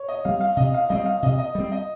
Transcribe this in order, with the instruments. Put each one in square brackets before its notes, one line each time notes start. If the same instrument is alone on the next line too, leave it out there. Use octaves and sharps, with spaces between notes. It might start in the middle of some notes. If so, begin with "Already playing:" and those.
Already playing: [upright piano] C#5
D#5
[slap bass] G3 C4 [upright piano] F5
[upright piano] F5
[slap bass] C3 [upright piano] D#5
[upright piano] F5
[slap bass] G3 C4 [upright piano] D#5
[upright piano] F5
[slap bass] C3 [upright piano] D#5
[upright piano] D#5
[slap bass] G3 C4
[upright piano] D#5